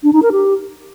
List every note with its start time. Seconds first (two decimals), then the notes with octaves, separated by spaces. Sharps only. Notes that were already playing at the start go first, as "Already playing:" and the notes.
0.03 D4
0.13 D#4
0.23 A#4
0.32 G4